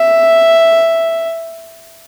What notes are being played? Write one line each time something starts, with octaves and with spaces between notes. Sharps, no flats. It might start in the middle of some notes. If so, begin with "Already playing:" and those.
Already playing: E5